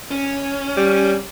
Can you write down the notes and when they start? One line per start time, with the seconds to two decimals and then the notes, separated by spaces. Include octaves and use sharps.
0.11 C#4
0.77 G3